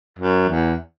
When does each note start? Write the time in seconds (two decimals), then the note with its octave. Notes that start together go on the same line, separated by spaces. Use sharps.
0.19 F#2
0.49 E2